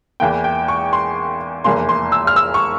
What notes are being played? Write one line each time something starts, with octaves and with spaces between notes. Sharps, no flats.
E2 E3 A#3 G5
G5
C#6
C6
F1 E2 E3 A#3 C6
C6
E6
F6
E6
C#6